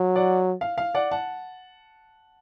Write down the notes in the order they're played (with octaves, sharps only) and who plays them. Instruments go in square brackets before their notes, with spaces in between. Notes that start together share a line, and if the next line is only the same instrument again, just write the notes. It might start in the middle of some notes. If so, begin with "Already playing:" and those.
Already playing: [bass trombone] F#3
[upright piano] D5 F#5
F5
F5
D5 F#5
F#5 A5